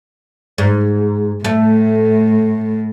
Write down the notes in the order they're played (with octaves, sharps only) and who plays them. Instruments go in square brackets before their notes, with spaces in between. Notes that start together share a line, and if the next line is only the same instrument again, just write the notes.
[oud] G#2
[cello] A2 [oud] A3